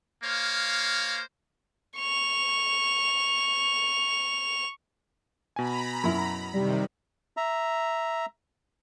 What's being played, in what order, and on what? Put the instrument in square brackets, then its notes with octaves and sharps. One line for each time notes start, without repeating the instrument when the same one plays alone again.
[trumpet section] A#3 C5 C#5 F5
[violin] C#6 F7
[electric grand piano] B2 G#5 [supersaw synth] A#5 B5
[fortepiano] F#2 E4
[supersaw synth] C3 D#3 [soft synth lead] G3
[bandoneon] E5 A#5